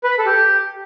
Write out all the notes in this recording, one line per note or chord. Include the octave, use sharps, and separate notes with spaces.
B4
B5
A4
G4